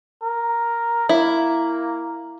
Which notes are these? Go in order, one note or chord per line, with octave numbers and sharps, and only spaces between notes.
A#4
A#3 E4